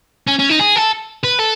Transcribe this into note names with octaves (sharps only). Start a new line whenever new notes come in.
C#4
C#4
D#4
G#4
A4
B4
A4